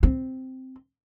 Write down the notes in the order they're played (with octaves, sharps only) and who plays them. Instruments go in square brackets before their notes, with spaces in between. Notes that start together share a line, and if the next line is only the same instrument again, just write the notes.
[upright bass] C4